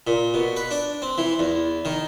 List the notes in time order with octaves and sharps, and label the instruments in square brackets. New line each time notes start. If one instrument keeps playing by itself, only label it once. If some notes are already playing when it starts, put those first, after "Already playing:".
[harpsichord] A#2
B2
B4
D4
C4
E3
E2
D#3